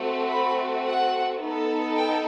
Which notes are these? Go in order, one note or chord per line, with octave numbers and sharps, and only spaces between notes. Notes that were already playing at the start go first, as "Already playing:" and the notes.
Already playing: A3 C4 F#4
B5
F#5
B3 D#4 A4
G5